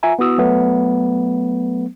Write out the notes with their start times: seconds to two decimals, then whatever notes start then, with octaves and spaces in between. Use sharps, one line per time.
0.03 F4 E5 G#5 A#5
0.19 B3 E4 F#4 D#6 E6
0.38 F#3 A3 B3